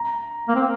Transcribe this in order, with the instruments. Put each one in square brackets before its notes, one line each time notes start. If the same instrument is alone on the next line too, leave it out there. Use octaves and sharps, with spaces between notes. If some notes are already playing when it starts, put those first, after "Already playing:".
Already playing: [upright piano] A#5
[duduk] A#3
C4